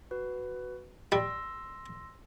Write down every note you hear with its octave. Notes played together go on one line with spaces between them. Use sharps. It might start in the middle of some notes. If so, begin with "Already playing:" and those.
F#4 B4
G3 C6 E6 A#6